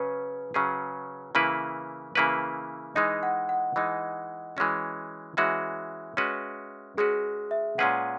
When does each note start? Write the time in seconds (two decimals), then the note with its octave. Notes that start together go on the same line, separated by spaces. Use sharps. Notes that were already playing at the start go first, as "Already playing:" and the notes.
Already playing: C#3 F#3 C#4 G#4 B4
0.54 C#3 F#3 C#4 G#4
1.35 C#3 E3 A#3 E4 B4
2.15 C#3 E3 A#3 E4 B4
2.95 E3 G#3 D#4 D#5
3.23 F#5
3.49 F#5
3.76 E3 G#3 D#4 D#5
4.57 E3 G#3 C#4 F#4
5.37 E3 G#3 C#4 F#4 E5
6.17 G#3 C#4 F#4 B4
6.97 G#3 C#4 F#4 G#4 B4
7.51 E5
7.78 A#2 G#3 C#4 G#4 B4 F#5